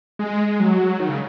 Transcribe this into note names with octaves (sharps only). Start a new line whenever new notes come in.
G#3
F#3
D#3
C#3